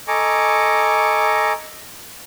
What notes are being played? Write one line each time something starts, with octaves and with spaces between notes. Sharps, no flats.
A4 D#5 G#5 A#5 C#6 D6